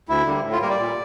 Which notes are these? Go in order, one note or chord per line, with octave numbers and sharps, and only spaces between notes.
D2 E4
D3 G3 A#3
A2
F4
G3 A#3 A#4
D5
A#2